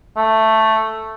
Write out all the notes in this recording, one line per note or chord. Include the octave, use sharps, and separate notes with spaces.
A3